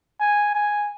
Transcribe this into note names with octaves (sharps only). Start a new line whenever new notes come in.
G#5
G#5